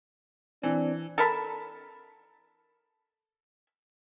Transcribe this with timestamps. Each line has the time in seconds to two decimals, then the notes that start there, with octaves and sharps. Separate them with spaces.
0.63 E3 C4 D4
1.18 A4 A#4 A5 B5